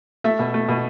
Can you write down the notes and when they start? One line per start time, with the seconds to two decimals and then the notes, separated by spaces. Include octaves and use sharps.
0.24 A3 E5
0.39 B2
0.54 A3
0.69 B2